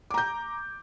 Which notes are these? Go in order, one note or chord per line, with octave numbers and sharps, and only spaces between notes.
A#5 D6 G6